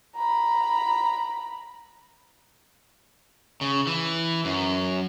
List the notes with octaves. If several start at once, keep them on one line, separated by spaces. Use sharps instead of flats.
A#5 B5
C#3
E3
F#2